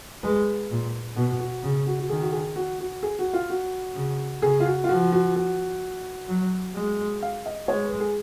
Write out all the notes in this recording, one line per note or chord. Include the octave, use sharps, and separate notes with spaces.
G#3 B4
A#2
B2 F#4
F#4
C#3
F#4
F#4
D#3 G#4
F#4
G#4
F#4
F#4
G#4
F#4
F4
F#4
C#3
C#3 G#4
F4
F#4
F4
F3 F#4
F#4
F#4
F#3
G#3
F5
D#5
G#3 C#5
B4
G#4